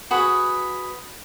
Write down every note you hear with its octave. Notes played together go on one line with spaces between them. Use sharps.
F#4 G#4 B4